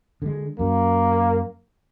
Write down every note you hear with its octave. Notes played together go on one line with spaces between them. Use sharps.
D3 G#3
F#2 A#3